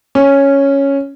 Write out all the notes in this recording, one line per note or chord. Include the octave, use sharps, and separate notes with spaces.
C#4